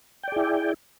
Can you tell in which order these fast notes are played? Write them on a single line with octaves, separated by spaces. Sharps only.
G5 D5 G#4 E4